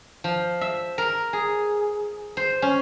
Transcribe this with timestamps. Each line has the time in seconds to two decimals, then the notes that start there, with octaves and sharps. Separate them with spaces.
0.24 F3
0.61 E5
0.98 A#4
1.33 G#4
2.37 C5
2.62 C#4